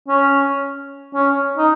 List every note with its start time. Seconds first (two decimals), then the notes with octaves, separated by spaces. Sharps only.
0.09 C#4
1.14 C#4
1.57 D#4